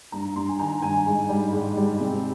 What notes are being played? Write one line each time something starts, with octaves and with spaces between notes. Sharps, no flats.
G2 A#5
G2 C6
G#5
D#3 A#5
G2 G#5
G#2
G3
G#2
G3
C3